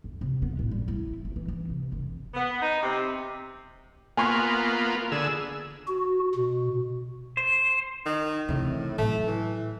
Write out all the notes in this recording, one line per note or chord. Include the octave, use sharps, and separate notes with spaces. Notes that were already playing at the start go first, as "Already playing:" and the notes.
D2
C3
B3
A2
G3
E4
A1
E3
E3
C3
F1
B3
D#4
C3
A#3 B3 F4 G#5 C6 C#6
D3 G#4 E6
F#4
B2
C5
D#3
A2 C3 E3
A2 F#3 A3
E3